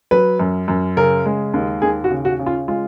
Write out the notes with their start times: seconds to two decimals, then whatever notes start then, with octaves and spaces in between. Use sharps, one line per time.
0.11 F#3 B4
0.40 F#2
0.68 F#2
0.97 C#3 A#4
1.26 G#3
1.54 D#2
1.82 D#2 G#4
2.04 F#4
2.11 C#3
2.25 F#4
2.39 C#3
2.46 F4
2.68 G#3 F4